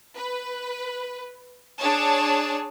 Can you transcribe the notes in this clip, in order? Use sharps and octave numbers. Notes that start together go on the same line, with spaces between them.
B4
D4 G#4 C#5 A5